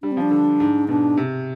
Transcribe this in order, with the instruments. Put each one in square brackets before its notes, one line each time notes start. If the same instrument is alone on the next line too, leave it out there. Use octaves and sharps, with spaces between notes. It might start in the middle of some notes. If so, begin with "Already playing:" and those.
[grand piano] G3 [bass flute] D4
[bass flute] C4
[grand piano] F3 [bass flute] D4
[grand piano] D3
G#2
[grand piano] B2 [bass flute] D4
[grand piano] C3